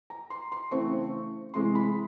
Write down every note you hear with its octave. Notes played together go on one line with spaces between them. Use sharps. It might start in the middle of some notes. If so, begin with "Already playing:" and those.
A#5
C6
C6
C#3 E3 A3 C4 C#6
C3 E3 G#3 C6
B5